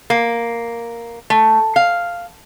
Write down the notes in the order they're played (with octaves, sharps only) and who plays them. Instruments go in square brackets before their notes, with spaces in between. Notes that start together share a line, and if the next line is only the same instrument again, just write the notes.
[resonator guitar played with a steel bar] A#3
A3
F5